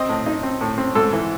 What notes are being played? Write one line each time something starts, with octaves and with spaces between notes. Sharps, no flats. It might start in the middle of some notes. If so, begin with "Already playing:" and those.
Already playing: C4 D#5
A2
D#4
C4
A2
C4
G#2 A4
E3